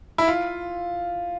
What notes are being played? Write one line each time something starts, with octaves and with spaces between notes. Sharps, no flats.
E4
F4